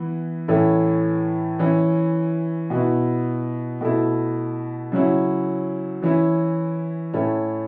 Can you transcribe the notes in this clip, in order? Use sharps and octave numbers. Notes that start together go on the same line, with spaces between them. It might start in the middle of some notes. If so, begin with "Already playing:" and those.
Already playing: E3 B3 E4
A2 E3 A3 C#4 E4
E3 C#4 E4
B2 B3 E4
B2 A3 E4
C#3 F#3 C#4 E4
E3 C#4 E4
A2 A3 C#4 E4